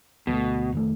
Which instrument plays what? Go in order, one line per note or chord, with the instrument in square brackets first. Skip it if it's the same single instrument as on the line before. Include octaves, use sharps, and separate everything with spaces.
[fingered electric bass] D2 G3 A3 [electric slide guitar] B2
[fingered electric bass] F1 D#3 A3